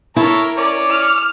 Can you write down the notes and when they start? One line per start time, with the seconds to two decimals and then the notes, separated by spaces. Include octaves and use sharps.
0.16 E4 A4 A#4 C#5
0.57 C#4 D5 D6
0.89 F6